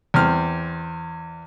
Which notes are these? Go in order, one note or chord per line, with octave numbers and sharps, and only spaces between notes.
E2 C4 F6